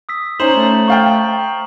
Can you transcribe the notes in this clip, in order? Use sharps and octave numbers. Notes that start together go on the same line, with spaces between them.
D#6 E6 B6
C#4 D#4 C5 A#5 E7 F#7
A3
C5 F5 G5 C#6